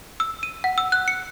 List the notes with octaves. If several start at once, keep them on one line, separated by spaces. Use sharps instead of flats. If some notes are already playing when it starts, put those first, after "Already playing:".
E6
D#7
F#5
E6
F#6
C#7